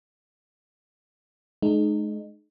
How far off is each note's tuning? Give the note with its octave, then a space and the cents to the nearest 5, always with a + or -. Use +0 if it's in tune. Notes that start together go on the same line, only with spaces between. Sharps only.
G#3 +40 D#4 -25